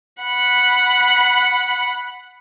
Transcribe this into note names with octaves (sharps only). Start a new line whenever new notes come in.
F#5 B5